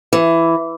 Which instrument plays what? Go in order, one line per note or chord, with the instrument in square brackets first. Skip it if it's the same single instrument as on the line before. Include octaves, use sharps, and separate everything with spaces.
[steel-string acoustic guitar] E3